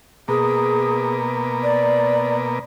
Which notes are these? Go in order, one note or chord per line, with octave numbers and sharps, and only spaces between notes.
B2 A#3 G#4
D5